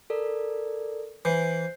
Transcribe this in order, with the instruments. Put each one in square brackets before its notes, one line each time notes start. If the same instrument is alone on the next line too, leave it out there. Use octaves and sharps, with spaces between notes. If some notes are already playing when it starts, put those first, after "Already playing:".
[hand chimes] A4 A#4 D5
[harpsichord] E3 [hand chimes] C5 G6 C7